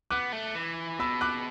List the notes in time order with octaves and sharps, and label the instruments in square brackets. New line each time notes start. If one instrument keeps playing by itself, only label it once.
[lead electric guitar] B3 [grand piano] D6 F#6
[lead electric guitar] A3
E3
[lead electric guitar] B2 [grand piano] B5 E6
[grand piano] D6 F#6